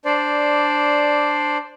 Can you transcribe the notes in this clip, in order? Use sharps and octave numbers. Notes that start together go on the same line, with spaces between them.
D4 C5 D5